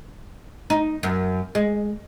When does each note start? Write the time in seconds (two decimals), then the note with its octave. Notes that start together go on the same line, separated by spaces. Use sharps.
0.70 D#4
1.03 F#2
1.55 G#3